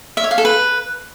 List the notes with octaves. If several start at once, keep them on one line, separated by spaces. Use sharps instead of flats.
E5
C#5
F5
A4
B4